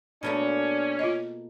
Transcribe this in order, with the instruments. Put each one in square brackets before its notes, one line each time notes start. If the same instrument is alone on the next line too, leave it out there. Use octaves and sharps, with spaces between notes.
[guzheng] B2 A3 A#3 [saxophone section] C#4 [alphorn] D4
[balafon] F4 D#5